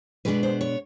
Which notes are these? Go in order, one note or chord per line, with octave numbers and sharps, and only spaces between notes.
B2 G#3 B3 D4 B4
C5
C#5